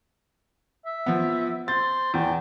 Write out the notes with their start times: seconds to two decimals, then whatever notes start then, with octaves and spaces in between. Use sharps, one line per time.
0.85 E5
1.06 F3 B3
1.68 C5 A6
2.14 E2 G5